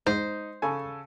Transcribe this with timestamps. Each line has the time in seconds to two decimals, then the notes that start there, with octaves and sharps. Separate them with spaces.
0.07 G#2 D#4 C5 D#5
0.62 C#3 A4 G#5